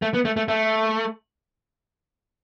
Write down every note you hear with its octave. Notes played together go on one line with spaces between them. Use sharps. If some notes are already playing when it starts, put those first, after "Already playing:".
A3
B3
A3
A3
A3